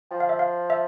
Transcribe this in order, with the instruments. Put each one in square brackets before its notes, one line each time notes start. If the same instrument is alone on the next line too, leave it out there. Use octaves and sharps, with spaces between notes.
[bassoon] F3 [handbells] G5
[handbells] F5
E5
F5
E5